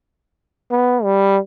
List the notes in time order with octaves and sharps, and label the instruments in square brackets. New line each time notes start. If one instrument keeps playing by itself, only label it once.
[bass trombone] B3
G3